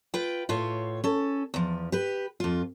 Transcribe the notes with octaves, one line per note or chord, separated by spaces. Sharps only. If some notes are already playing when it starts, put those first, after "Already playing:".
F4 B4 G5
A2 F4 C#5
C#4 A4
E2 F3
G4 B4
F2 F4